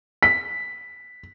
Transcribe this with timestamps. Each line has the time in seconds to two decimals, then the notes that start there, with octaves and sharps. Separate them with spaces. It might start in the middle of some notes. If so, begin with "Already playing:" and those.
0.23 B6